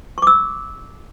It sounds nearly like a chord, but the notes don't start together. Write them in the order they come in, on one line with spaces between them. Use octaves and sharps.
C#6 D6 E6